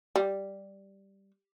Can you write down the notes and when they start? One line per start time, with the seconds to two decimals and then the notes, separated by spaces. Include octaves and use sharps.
0.16 G3